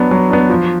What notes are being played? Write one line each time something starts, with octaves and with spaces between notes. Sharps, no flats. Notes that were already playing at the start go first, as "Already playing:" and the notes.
Already playing: F#3 B3 D4
F#3
B3 D4
F3